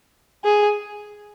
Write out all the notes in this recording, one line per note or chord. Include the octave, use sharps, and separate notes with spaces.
G#4